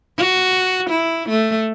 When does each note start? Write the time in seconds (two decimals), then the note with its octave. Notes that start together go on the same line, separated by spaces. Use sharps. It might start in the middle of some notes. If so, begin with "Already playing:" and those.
0.18 F#4
0.90 E4
1.29 A3